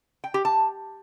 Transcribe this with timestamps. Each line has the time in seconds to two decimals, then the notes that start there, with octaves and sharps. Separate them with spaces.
0.24 G5
0.34 G4
0.45 A5